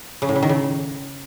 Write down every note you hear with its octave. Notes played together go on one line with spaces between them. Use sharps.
C#3
A2
C#3
D#3
C#3